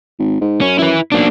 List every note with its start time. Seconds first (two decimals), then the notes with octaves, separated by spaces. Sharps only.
0.19 G#1
0.41 G#2
0.61 F#2 C#4
0.79 E4 B4
1.12 B1 A#3 D4